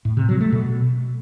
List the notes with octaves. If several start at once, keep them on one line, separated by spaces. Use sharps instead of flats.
A2
C3
F#3
A3
B2